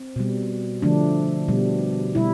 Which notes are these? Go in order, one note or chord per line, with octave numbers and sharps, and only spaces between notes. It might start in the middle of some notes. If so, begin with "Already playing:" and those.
Already playing: C4
B2 G3
D3 F3 A3 D4
B2 G3
B2 G3 E4